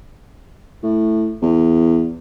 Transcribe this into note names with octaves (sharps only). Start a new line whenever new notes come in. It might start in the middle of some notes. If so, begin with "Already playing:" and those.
A2
E2